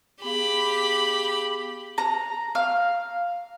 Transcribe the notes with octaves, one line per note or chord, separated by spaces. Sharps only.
B3 G4 G#4 F5 B5
A#5
F5